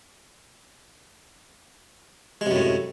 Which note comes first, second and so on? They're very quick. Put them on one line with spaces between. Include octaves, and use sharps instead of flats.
G#3 C3 F#2 A2